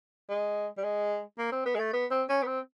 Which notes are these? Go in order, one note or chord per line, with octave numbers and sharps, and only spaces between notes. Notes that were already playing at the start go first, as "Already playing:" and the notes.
G#3
G3
G#3
A#3
C4
B3
G#3
A3
B3
C4
C#4
B3
C4